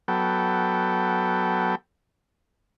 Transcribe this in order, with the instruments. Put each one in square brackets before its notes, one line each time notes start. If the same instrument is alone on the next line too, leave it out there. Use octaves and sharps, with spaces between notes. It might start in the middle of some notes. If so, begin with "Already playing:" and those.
[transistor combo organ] F#3 B3 A4 G5